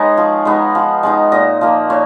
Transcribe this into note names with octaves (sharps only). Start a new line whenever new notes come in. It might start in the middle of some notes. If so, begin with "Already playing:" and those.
Already playing: G#3 B3 D#4 C#5
F3
G#3 B3 D#4
F3
G#3 B3 D#4
A#2 D#5
F3 A#3
A#2 C#5